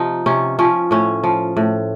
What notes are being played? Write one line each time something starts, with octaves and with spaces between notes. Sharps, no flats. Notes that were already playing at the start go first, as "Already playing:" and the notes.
Already playing: C3 F3 D#4
C3 C#4
F3 C#4
A2 C#4
F3
A2